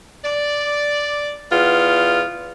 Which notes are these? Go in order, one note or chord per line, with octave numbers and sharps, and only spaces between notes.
D5
E2 B3 F4